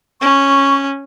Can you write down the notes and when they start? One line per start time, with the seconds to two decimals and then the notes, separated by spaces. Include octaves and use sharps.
0.21 C#4 C#6